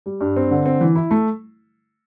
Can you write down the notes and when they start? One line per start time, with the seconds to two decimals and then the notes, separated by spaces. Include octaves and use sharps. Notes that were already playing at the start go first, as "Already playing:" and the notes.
0.06 G3
0.21 G2
0.36 C4
0.51 D3
0.66 C4
0.81 E3
0.96 E4
1.11 A3